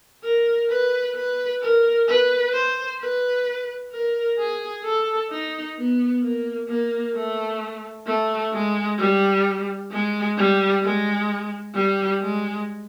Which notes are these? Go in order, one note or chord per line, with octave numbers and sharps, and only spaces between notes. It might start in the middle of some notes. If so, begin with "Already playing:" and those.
A#4
B4
B4
A#4
B4
C5
B4
A#4
G#4
A4
D#4
B3
A#3
A#3
A3
A3
G#3
G3
G#3
G3
G#3
G3
G#3